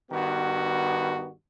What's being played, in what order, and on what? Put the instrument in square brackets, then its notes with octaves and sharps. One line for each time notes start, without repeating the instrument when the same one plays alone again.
[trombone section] G2 D#3 B3 F#4